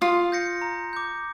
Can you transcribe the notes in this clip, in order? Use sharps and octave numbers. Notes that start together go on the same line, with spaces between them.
F4 D#6
G6 A#6 C#7
A#5
D6 G6